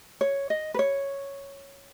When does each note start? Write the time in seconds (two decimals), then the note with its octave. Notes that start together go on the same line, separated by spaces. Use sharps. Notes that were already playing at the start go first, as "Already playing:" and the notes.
0.21 C#5
0.50 D#5
0.74 B4
0.79 C#5